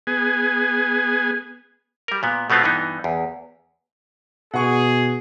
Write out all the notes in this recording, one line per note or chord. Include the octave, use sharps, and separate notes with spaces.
B3 G#4 G#5
G3 A#4
A#2 B3
B2 A3 B3 C4 F4
G2 E3 B3 D#4
E2
B2 G#4 F#5 C#6